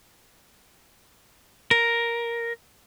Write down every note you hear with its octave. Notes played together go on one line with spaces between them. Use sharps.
A#4